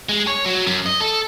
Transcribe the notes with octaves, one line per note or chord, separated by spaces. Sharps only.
G#3
C#5
F#3
F#2
D#5
A4